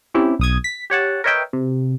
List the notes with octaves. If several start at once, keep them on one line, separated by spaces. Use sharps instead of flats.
C4 C#4 E4 G4
B1 D#6 G#6
B6
G4 C#5 F#5 A5
A#4 B4 C#5 D#5 E5 G5
C3